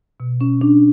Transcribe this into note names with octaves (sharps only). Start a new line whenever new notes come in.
B2
C#4
D4